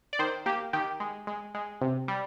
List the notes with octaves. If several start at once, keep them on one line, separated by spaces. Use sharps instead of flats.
D5
D#3 C5
A#3 G4
D#3 G4
G#3
G#3
G#3
C3
G3